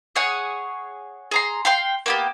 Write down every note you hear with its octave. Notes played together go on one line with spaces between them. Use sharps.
G#4 C#5 F#5 G#5
G#4 A#5 C6
F5 G5 C6
A#3 B3 G4